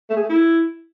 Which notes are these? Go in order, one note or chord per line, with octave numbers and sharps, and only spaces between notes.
A3
G#4
A3
E4